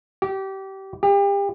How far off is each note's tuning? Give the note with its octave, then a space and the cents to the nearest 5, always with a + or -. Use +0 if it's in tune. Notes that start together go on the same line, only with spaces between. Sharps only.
G4 -25
G4 +35